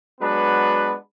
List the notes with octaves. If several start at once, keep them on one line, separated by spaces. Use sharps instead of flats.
F#3 G#3 B3 D4 B4